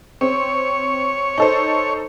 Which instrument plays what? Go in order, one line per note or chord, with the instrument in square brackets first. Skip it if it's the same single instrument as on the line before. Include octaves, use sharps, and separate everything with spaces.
[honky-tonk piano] C4 [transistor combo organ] C#5
[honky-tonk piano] D#4 A4 C5